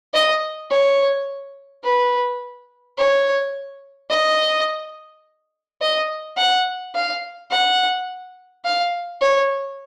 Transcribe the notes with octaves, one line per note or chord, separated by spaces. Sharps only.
D#5
C#5
B4
C#5
D#5
D#5
F#5
F5
F#5
F5
C#5